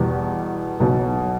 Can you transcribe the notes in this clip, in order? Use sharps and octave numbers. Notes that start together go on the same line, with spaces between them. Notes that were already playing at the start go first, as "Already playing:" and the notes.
Already playing: E2 B2 G3
B1 B2 F#3